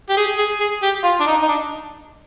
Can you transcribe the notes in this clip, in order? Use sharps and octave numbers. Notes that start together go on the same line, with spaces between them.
G4
G#4
G#4
G#4
G4
F4
D4
D#4
D#4
D4